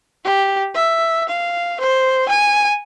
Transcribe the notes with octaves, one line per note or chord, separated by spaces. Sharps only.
G4
E5
F5
C5
G#5